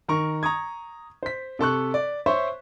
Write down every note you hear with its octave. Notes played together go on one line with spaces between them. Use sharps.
D#3 A#4 C#6
A#5 C#6 D#6 G#6
C5 B6
C3 A4 C#6 F#6
D5
C5 C#5 E5 C6 C#6